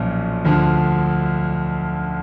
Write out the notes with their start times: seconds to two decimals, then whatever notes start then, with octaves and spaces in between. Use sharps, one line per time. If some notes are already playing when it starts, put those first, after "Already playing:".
Already playing: B1 A#2 F3 C#4
0.45 D2 D3 F3